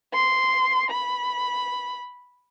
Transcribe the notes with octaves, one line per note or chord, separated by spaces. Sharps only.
C6
B5